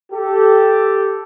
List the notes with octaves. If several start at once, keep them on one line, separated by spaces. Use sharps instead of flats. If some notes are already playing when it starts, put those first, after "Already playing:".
G4 A4